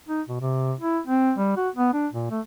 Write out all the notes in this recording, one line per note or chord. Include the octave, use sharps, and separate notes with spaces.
D#4
B2
C3
E4
C4
G3
F#4
B3
D4
A#2
A3